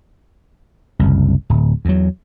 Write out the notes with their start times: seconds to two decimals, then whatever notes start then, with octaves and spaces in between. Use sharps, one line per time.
0.99 F#1 C2
1.50 D1
1.85 E2 F#3